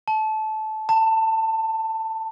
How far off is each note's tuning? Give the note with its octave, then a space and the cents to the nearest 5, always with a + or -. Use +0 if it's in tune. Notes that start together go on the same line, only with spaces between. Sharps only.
A5 -20
A5 +20